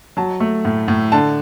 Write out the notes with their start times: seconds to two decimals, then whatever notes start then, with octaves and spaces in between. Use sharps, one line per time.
0.17 F#3 A5
0.40 A3
0.65 A2
0.88 A2
1.12 D3 A5